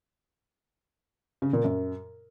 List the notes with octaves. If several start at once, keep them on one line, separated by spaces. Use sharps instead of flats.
C#3
A#2
F#2